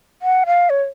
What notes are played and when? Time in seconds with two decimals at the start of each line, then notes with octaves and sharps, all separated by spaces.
0.22 F#5
0.46 F5
0.70 C#5